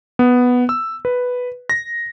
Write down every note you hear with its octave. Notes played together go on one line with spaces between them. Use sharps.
B3
E6
B4
A#6